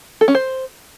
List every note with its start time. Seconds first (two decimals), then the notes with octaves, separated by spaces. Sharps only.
0.21 A4
0.28 C#4
0.35 C5